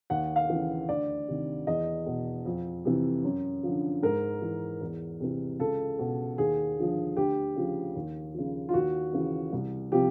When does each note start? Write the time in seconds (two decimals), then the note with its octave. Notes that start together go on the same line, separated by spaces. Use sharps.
0.10 D#2 F#5
0.36 F5
0.50 C#3 E3
0.88 D2 D5
1.28 C3 D#3
1.67 E2 D#5
2.06 B2
2.46 F2
2.85 C3 E3
3.24 F#2
3.63 D3 F3
4.02 G#2 A#4
4.42 E3
4.81 E2
5.20 C3 E3
5.59 C#2 A4
5.99 B2
6.38 D#2 G#4
6.77 D3 F3
7.17 D2 G4
7.56 C#3 F3
7.95 D#2
8.34 C#3 F3
8.69 F4
8.73 D#2 F#4
9.13 C#3 E3
9.52 C2
9.92 C3 F3 G4